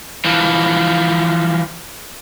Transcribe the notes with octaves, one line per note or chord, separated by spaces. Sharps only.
E3 F3